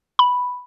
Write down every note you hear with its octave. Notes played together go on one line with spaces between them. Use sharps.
B5